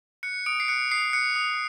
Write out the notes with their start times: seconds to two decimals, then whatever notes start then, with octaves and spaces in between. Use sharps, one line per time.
0.23 F#6 C#7
0.46 D#6 D7
0.60 C7
0.68 F#6 C#7
0.91 D#6 C7
1.13 F#6 C#7
1.36 D#6